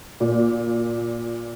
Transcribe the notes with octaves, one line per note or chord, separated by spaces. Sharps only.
A#2